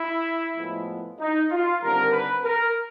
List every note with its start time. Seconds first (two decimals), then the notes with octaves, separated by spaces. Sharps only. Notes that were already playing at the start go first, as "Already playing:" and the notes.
Already playing: E4
0.56 A2 F3 G#3 B3
1.19 D#4
1.51 F4
1.81 D#2 D3 G3 C4 A#4
2.13 B4
2.44 A#4